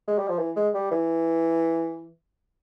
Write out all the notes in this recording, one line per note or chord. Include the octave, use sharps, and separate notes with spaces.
G#3
G3
F3
E3
G#3
G3
E3